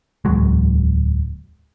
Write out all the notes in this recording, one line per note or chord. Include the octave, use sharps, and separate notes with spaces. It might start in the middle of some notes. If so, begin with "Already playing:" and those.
D1 E2 F#3 G#3